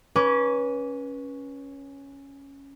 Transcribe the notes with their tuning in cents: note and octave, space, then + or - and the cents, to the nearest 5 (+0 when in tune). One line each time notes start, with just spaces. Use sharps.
C#4 +0 B4 -25 D6 -30